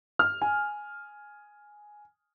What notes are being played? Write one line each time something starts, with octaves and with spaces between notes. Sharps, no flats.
F6
G#5